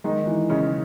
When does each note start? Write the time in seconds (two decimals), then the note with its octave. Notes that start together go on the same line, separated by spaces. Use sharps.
0.04 D#3 G#3 D#4
0.27 E3
0.49 C#3 C#4 D#4